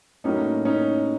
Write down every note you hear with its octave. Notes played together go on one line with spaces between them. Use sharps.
A2 F#3 A#3 C#4 D#4
C#4 D#4